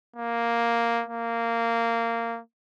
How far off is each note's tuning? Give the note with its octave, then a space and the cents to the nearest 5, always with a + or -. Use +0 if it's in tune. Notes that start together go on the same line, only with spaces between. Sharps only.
A#3 +0
A#3 -15